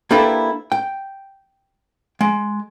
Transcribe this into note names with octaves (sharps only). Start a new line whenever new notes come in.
A#3 D4 E4 G4 A4 B4
G5
G#3